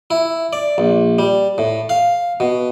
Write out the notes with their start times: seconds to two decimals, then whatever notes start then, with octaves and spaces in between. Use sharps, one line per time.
0.11 E4
0.53 D5
0.78 A#1
1.19 G3
1.58 A2
1.89 F5
2.40 B2